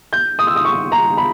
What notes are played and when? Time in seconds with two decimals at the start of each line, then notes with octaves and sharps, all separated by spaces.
0.13 G6
0.39 D#6
0.47 E6
0.56 D#6
0.65 C#6
0.92 A#5
1.17 B5